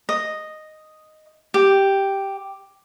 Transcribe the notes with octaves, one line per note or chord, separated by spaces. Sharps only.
D#5
G4